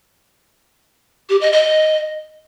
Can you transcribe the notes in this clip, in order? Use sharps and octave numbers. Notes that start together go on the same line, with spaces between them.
G4
D#5
D#5